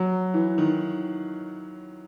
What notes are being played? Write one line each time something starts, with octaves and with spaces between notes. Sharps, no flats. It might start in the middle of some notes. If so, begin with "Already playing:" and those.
Already playing: F#3
E3
D#3